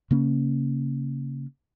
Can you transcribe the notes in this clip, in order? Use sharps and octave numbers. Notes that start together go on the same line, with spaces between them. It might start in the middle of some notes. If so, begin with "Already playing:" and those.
C#3 A#3 C#4